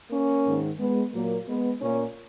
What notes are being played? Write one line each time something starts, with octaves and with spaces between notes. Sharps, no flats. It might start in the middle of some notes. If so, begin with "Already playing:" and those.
A#3 C#4
G#2 D#3
G#3 B3
A#2 F#3 A#3
G#3 B3
A#2 A#3 C#4